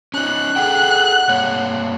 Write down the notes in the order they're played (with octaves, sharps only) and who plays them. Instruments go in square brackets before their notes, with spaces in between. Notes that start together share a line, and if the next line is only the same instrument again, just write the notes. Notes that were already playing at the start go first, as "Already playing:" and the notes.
[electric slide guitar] C#4 D#4 [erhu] F#6
[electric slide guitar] G#4 A4 G5 [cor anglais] F#5
[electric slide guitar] G2 A#3 C#5